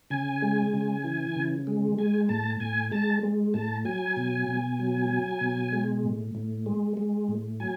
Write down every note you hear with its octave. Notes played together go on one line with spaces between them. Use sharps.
C#3 G#5
G#3
C#3
E3
C#3
G#3
G#3 G#5
A2 A5
A2 G#5
G#3 A5
G#3
A2 A5
F#3 G#5
B2
B2
F#3
F#3
B2
G#3
A2
A2
G#3
G#3
A2
F#3 G#5